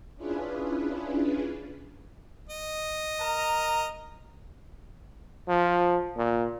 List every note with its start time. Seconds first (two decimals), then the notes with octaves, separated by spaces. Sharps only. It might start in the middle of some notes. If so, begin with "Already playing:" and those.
0.17 C#4 D4 E4 F4 G#4 B4
2.49 D#5
3.20 A#4 A#5
5.48 F3
6.17 A#2